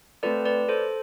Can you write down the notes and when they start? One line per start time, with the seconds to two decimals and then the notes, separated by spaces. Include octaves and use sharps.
0.23 A3 C4 F4 A4 B4 D5
0.45 B4 D5
0.69 A4 C5